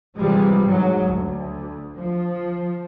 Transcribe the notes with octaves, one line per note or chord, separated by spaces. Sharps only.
G#2 C3 E3 F3 G3 G#3
G#2 F#3
D2
F3